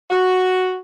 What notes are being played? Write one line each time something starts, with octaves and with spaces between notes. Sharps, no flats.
F#4